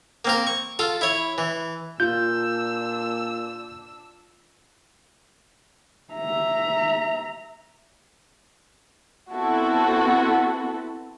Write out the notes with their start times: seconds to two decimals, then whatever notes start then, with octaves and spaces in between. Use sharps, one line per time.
0.25 A#3 C4 A#4
0.47 C#6
0.79 F4 A4
1.01 E4 C#5
1.38 E3
2.00 A#2 D4 F4 E6 G6
6.14 E5 A#5
9.31 B3 C4 E4 F#4 A4